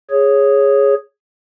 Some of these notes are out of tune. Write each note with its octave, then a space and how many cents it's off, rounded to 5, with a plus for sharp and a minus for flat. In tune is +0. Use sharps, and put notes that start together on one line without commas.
G#4 -5 C#5 -5